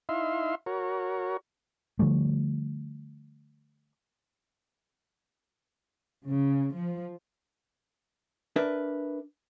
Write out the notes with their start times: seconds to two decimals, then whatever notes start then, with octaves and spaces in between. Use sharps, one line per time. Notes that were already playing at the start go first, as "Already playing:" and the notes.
0.09 D#4 E4 E5 F5 C6
0.66 F#4 A#4 C#5
1.99 D3 F3 G3 A3
6.26 C#3
6.77 F3
8.56 D4 A#4 B4 E5